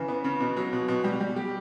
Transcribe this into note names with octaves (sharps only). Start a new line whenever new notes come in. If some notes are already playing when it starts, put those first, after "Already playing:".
Already playing: C#3 E3
B3
C#3
B2
F#3
B2
B2
G3
G3
G4